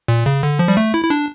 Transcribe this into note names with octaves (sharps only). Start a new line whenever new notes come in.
A#2
C#3
D3
F3
G3
A3
E4
E4
D4